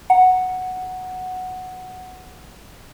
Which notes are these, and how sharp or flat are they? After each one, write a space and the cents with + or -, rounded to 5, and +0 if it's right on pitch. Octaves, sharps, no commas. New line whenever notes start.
F#5 +0 A#5 +0